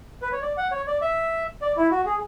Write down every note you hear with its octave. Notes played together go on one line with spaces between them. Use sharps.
B4
C#5
D5
F#5
C#5
D5
E5
D5
E4
F#4
G#4